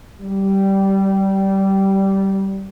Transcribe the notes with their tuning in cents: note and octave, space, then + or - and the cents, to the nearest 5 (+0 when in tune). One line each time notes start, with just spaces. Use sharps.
G3 -15